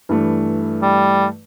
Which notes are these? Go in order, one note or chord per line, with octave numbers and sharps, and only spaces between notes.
G2 E3 A3
G3